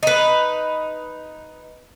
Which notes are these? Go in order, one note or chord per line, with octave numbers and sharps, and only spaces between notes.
D#4 B4